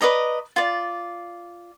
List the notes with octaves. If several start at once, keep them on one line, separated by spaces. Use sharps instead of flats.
B4 D5 D#5 A#5
F4 D5